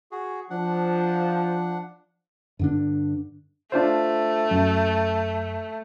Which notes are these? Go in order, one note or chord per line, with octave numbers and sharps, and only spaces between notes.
F#4 G#4
F3 D4 F#5
G2 D3 D4
A3 D4 F4 C5
F#2